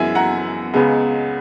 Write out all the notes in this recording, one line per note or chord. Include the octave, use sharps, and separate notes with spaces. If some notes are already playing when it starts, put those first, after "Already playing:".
Already playing: F#2 E3 G#3 B3 E5 G#5
F#5 A#5
C#2 C#3 G#3 B3